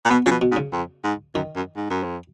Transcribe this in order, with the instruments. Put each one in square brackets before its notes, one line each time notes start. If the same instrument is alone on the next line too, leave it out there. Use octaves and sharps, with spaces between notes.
[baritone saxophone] A#2
[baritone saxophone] B2 [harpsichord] B3
[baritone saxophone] C#3 [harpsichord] F3
[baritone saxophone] B2
[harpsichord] B2
[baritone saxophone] G#2
[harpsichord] C#3
[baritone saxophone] F2
G#2
[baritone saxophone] F#2 [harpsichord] D#3
[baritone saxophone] F#2
G#2
F#2
F2